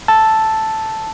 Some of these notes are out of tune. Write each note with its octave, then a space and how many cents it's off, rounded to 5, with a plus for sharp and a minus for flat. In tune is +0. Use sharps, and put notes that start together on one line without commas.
A5 +0 E6 +0